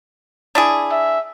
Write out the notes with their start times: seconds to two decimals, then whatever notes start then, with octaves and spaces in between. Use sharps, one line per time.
0.55 D4 E4 G#4
0.92 E5